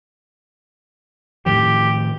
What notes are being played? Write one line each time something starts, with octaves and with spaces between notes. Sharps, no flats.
A2 D#3 F3 G4